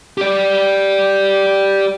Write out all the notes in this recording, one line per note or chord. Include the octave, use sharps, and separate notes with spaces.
G4 D5